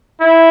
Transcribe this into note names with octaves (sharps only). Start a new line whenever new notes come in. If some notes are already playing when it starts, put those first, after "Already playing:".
E4